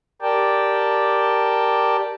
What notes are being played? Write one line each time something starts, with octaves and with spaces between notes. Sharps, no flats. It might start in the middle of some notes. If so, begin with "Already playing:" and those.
G4 A#4 D5 G5 A5